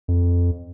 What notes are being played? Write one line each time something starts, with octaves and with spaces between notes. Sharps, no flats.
F2